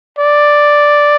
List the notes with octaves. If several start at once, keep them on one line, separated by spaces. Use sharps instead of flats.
D5